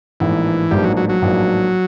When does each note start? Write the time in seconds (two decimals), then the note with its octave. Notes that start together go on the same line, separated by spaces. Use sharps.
0.20 A1 G#2 E3 F3 A#3 D4
0.71 A1 G#2 F3 G3 A#3 D4
0.84 F#3
0.97 F#3
1.09 F#3
1.22 A1 G#2 F3 A#3 D4